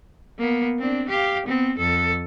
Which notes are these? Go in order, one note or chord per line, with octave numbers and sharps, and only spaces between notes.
A#3 B3
C4 D4
G4 F5
B3 C4
F2 A4